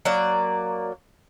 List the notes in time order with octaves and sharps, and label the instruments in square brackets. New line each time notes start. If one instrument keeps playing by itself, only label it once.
[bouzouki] F#3 A#3 D5